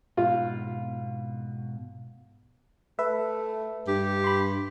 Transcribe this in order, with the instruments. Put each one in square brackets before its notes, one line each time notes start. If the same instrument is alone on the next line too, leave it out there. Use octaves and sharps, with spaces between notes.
[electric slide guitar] G#2 B2 [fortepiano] F4
[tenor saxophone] A3 [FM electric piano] B4 E5
[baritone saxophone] G2 [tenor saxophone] G4
[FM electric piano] B5 C6